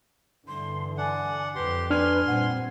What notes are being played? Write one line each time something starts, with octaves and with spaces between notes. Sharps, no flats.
G2 D3 E3 C6
D4 F#5 G#5
F2 G4 B4 C6
D4 B4 G#5 C6 F6
A#2 G3 C4 F#5